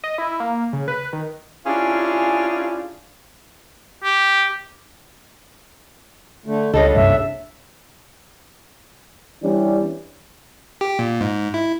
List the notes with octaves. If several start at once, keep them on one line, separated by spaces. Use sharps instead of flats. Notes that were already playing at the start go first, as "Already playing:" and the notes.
D#5
E4
A#3
C#3
B4
D#3
C#4 D4 E4 F4 G4 G#4
G4
D3 A3
C#2 C#3 G3 D4 A4 D#5
F#1 C2 G2 E5
E3 G3 B3 C#4 D4
G4
A#2
G#2
E4